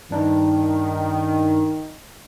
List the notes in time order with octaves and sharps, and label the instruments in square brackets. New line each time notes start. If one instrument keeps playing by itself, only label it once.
[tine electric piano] G2 D4 D#4 [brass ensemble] D#3